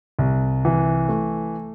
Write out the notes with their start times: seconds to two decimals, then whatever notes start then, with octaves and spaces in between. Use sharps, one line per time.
0.19 C2
0.65 E3
1.09 A3